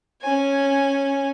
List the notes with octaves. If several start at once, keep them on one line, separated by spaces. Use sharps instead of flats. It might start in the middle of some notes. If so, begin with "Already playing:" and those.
C#4 G#5